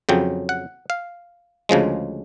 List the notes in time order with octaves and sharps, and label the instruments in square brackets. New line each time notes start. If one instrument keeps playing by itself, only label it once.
[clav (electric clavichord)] F2 C#3 F#3 G5
F#5
F5
D2 C#3 F3 G#3